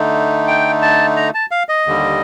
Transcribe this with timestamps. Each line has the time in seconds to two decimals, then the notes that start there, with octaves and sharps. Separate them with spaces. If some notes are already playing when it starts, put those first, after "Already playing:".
Already playing: D3 A3 D#4
0.47 G5
0.82 A5
1.16 A#5
1.34 A5
1.51 F5
1.69 D#5
1.86 D#2 D3 G3